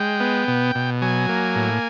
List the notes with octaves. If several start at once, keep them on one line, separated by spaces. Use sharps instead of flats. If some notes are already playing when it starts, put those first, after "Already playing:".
Already playing: G#3 G5
B3
B2
B2
F#3 G#5
A#3
A2